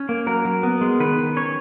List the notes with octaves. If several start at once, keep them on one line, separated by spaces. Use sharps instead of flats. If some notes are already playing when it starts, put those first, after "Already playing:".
Already playing: C#4
A#3
F#3 A#4
F#3
B3
G#3
D#3 B4
D#3
C#4 C#5